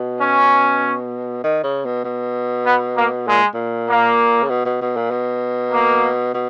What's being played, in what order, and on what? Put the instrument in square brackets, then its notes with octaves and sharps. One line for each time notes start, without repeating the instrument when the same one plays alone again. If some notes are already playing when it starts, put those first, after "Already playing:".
Already playing: [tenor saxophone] B2
[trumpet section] C#4
[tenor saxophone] D#3
C#3
B2
B2
[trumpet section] B3
A#3
[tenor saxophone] A#2 [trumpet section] G#3
[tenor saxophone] A#2
[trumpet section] A#3
[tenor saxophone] C#3
B2
B2
B2
A#2
B2
[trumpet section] A#3
[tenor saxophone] B2